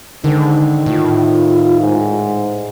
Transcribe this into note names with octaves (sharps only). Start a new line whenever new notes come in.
G#2 D3 D#3
A2 F4
G#2